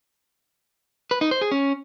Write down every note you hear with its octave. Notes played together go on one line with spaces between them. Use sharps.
B4
D#4
C5
G#4
C#4